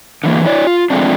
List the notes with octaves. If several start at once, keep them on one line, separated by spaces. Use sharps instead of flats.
D3 E3 A#3
E4 C#5 D5
F4
F3 G#3 A3 C4 D4